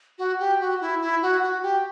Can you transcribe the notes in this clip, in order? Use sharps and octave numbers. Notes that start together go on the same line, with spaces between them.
F#4
G4
F#4
E4
E4
F#4
F#4
G4